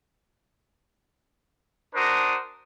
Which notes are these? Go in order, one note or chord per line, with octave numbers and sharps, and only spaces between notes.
D4 F#4 A#4 C5 D#6